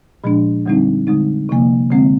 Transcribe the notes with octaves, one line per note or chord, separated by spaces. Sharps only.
A#2 F3 G#3 D4
F2 D3 G3 C4 D#4
D3 G#3 D#4
C3 F3 A#3
D3 G#3 C4